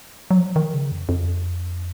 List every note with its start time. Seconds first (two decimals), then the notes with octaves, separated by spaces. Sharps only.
0.31 F#3
0.38 F3
0.56 D#3
0.74 C#3
0.92 F2
1.09 F2